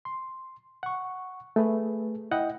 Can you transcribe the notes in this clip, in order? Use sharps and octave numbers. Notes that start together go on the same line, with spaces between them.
C6
F#5 C#6
A3 G#4 B4
E4 D#5 F#5 G5